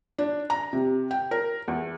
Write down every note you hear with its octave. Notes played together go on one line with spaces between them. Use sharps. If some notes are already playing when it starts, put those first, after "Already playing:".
D4
A#5
C3
G5
A#4
E2